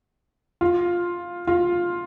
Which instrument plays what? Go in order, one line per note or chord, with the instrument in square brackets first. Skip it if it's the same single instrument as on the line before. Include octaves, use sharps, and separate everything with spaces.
[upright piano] F4
F4